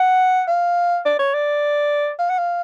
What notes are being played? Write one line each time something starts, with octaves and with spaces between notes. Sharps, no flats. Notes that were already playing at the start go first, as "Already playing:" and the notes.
Already playing: F#5
F5
D5
C#5
D5
F5
F#5
F5